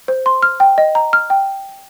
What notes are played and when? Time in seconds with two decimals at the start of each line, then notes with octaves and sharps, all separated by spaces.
0.08 C5
0.26 C6
0.42 F6
0.60 G5
0.78 D#5
0.95 A#5
1.13 F6
1.30 G5